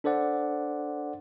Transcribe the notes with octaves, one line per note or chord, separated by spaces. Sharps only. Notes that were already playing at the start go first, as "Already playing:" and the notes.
D4 A4 C5 D5 F#5